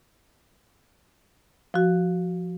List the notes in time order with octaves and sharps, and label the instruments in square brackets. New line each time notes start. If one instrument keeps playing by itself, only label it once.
[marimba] F3 F#4